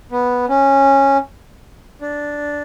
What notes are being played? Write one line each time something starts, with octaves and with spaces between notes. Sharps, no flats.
B3
C#4
D4